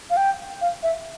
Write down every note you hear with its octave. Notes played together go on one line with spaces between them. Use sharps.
F5
G5
F5
E5